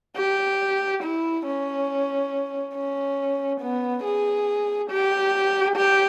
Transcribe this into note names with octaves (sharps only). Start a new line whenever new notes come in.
G4
E4
C#4
C#4
B3
G#4
G4
G4